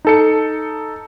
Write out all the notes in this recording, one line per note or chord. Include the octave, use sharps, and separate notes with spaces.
D#4 A4 C#7